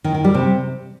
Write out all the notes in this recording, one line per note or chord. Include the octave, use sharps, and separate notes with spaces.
D#3
D#3
G3
C3